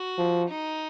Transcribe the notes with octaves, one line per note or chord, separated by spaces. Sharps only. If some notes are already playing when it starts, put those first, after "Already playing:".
Already playing: F#4
F3
D#4